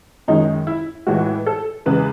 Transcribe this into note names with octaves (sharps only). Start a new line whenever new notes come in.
F#2 D#3 G#3 D#4
E4
A2 E3 G#3 F#4
A4
E2 C#3 G#3 B4